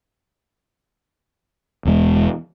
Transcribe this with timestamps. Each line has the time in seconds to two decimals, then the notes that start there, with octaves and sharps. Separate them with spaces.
1.85 E1 E2 G#3